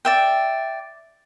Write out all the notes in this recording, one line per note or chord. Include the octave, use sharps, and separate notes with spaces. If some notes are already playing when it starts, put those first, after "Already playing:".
D5 E5 G5